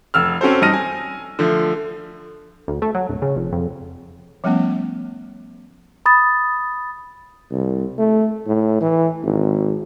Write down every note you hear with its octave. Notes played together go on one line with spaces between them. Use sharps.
F1 E6 F6
C4 C#4 F#4 A4 C5
G2 D#4 A5 F6 A#6 D#7
G#5
D3 F3 A3
D2
A3
F#3
D1
C#3
F1
F2
F3 G3 A3 B3 C#4
B5 D#6 A6
C2
A3
A2
E3
G#1